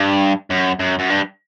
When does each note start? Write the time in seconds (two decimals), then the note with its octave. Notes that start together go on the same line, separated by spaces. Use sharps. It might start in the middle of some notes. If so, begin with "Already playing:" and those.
Already playing: G2
0.50 F#2
0.80 F#2
0.99 F#2
1.10 G2